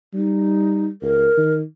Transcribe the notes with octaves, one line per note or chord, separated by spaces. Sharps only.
G3 D#4
C#2 A#4
D#3